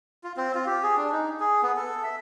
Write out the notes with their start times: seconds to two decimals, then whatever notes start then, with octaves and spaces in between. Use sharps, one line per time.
0.24 F4
0.37 C4
0.55 F4
0.66 G4
0.83 G#4
0.97 D4
1.12 D#4
1.40 G#4
1.63 B3
1.77 A4
2.03 E5